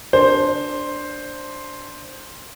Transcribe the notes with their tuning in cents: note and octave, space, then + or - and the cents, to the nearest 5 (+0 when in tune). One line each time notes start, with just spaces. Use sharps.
D4 +0 C5 +5